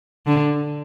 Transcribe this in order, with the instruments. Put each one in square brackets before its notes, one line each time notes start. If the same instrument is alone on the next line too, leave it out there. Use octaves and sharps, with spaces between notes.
[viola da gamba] D3